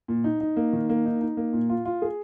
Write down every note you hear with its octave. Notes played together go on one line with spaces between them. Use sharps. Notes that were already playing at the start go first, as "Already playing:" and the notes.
A#2
D#4
D#4
A#3
D#3
A#3
D#4
D#4
A#3
A#2
F4
F4
G#4